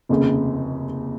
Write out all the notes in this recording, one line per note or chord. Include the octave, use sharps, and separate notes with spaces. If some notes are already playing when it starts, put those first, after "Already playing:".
F1 D#2 C#3